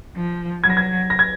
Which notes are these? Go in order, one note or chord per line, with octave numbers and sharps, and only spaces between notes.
F3
F#3 G#6
A#6
G#6
A#6
G#6